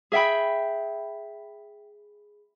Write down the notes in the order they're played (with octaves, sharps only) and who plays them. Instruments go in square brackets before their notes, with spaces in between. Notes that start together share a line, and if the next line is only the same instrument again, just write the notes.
[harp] G#4 E5 G5 B5